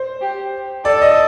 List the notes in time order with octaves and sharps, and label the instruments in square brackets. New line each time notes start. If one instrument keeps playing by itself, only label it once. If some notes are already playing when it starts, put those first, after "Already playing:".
Already playing: [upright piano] C5
[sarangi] G4
[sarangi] A4 [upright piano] D5
[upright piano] D#5